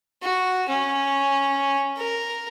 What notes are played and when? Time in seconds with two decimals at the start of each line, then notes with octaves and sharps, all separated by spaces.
0.22 F#4
0.68 C#4
1.97 A#4